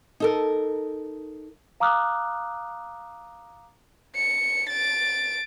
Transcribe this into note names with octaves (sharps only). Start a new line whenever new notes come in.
D#4 A4 A#4
F5 A#5 D6 D#6 F6 F#6
C#7
A6 D7